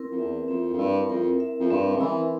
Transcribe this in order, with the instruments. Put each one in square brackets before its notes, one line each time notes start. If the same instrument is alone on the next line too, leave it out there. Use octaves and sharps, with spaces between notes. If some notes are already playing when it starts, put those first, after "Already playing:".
Already playing: [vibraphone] C4 E4 A#4
[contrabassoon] F2
[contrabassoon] E2 [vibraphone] E5
[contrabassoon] F2 [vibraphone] C4
[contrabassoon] F2
[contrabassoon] G2 [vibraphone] E4
[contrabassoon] F2 [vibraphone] A#4
[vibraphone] E5
[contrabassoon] F2
[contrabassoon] G2 [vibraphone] C4
[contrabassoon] C#3
[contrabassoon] E3 [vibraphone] E4